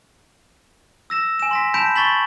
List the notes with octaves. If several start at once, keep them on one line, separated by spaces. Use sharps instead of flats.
E6 A#6 E7
G#5 E7
C6 A#6 B6
A5 B5 G6 B6 D7 E7
C#6 A6 B6 F#7